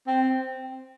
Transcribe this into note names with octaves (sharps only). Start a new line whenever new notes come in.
C4